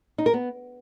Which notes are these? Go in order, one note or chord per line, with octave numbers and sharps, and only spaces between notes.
D#4
A#4
B3